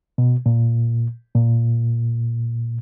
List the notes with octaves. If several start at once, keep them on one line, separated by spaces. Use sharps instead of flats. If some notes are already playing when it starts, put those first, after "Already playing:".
B2
A#2
A#2